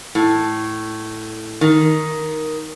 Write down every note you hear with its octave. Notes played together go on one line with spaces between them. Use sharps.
A2
D#3